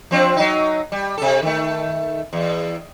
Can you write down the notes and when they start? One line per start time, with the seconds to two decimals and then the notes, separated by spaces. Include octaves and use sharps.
0.11 F3 C4 D4
0.37 F#3 D#4
0.92 G3
1.18 C3 A4
1.42 D#3 A3
2.33 E2